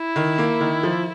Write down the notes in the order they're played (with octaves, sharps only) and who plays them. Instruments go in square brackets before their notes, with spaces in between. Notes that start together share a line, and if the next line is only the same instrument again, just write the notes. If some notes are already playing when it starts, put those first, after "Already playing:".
Already playing: [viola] E4
[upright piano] D#3
A#3
D#3
F3